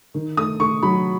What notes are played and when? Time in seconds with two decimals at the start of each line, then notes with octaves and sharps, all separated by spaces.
0.14 D#3
0.37 A3 D#6
0.60 A3 C#6
0.82 F#3 B5